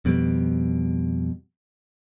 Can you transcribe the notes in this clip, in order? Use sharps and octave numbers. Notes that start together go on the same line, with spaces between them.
F2 B2 G3